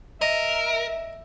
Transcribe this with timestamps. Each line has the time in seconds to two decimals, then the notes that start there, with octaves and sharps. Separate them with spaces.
0.22 A#4 D#5 E5